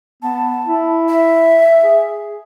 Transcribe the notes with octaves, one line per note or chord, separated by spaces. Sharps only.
B3 A5
E4
E5
G#4